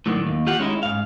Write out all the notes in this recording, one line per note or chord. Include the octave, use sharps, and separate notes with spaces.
A2 D3 D#3 F#3
D#2
F4 G4 F#5
G#3 C#4 D#4 E4
G#2 F5